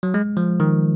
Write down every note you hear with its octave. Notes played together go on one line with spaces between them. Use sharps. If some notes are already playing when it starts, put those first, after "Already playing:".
F#3
G#3
F3
D#3